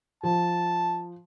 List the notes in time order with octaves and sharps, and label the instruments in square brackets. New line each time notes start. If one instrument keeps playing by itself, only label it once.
[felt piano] F3 [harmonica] A5